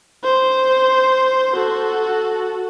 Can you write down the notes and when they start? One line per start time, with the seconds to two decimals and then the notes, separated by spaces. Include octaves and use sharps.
0.24 C5
1.54 F#4 A4